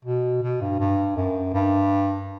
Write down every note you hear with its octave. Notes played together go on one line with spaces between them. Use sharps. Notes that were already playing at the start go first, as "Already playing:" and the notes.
B2
B2
G2
G2
F#2
G2